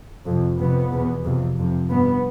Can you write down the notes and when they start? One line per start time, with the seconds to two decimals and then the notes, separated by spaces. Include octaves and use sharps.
0.26 F2 C3
0.59 F2 C3 B3
0.92 E2 B2
1.24 F2 C3
1.58 F2 C3
1.90 G2 B3